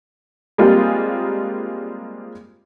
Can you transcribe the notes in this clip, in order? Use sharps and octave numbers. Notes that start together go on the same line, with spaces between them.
G3 G#3 A#3 C4 F4 G#4